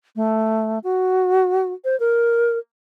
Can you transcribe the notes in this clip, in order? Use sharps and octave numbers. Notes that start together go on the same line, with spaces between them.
A3
F#4
C5
A#4